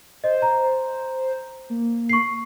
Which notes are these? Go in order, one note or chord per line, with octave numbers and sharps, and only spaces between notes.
C5 D#5
A#5
A#3
C#6 C7